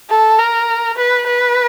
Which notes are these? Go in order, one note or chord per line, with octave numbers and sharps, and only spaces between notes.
A4
A#4
B4
B4